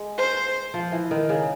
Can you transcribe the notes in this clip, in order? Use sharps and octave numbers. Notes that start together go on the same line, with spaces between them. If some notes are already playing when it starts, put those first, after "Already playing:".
Already playing: G#3
C5
F3
E3
D#3
C#3